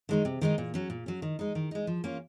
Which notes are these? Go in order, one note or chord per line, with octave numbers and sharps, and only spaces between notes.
D#3 G#3 D#4
C3
D#3 G#3 D#4
A#2
F#3 C#4
A#2
F#3 C#4
D#3
G#3 D#4
D#3
G#3 D#4
F3
A#3 C#4 F4